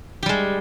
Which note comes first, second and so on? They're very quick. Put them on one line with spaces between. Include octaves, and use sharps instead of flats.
G4 G3 G#3